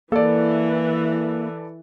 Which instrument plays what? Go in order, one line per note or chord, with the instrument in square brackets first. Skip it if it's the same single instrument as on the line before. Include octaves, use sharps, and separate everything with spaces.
[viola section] E3 [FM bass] A#3 [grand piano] A4 D5